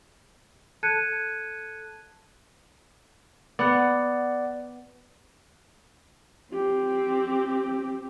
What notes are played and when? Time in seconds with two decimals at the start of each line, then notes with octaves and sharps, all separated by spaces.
0.83 A4 A5 F#6 G#6 C#7 D#7
3.59 B3 D5 F#5
6.52 C4 G4